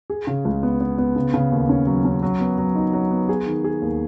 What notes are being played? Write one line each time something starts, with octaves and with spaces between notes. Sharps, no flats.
G#4
C#3
C#2
B3
B3
B3
C#3
C#3
D#2
C#4
F#3
C#4
F#3
B3
F#3
D#4
F#3
B3
G#4
D#3
G#4
D#2